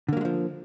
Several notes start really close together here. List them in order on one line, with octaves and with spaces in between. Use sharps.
D3 A#3 F#3 G#3 F3